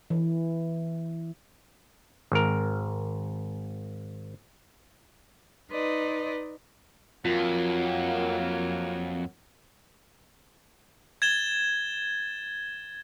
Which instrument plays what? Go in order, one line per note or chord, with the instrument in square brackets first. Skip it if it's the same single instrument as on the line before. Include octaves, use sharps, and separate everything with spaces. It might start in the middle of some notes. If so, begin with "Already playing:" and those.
[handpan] E3
[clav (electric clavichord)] G#1 A#4
[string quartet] D#4 B4 D5 D#5 C6
[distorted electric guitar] F2 [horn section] F#3 A#3 [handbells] F4
[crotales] G#6 A6 E7 G7